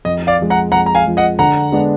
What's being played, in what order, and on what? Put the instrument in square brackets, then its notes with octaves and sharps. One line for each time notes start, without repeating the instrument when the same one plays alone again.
[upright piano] F2 [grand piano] D#5
[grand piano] D5 F5
[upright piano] F3 G#3
[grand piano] F#5 A#5
[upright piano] F2 [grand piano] F#5 A#5
[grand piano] A#5
F5 G#5
[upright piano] F3 G#3
[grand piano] D#5 F#5
[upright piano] D3 [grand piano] F#5 A#5
[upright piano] G#3 B3 D4